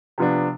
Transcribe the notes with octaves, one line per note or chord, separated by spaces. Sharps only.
C3 F3 B3 D4